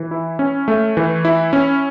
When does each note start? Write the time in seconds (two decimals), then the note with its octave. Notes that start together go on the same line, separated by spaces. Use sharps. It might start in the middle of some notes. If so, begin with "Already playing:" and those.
Already playing: E3
0.11 E4
0.39 C#4
0.68 A3
0.97 E3
1.25 E4
1.53 C#4